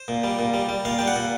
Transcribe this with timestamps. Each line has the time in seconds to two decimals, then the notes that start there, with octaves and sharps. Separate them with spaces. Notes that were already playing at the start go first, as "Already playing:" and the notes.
Already playing: C5
0.08 A#2
0.24 G3
0.39 A#2
0.54 G3
0.69 G3
0.85 A#2 F5
0.99 G3 G5
1.07 F#5
1.16 A#2